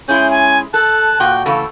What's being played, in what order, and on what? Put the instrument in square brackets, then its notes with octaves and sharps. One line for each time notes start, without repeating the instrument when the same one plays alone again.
[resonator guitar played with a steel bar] G#3 E4 G#4 [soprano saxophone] C#4 [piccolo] G6
[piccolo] G#5
[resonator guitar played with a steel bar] A4 [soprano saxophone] A5 [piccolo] F#6
[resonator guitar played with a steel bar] A#2 F#4 [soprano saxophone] G5
[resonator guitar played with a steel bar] C#3 E3 A3 [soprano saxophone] A4